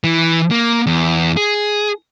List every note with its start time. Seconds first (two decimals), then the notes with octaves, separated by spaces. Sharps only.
0.04 E3
0.51 A#3
0.87 E2
1.37 G#4